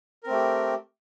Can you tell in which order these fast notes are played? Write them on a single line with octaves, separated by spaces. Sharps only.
A#4 C4 A3 G4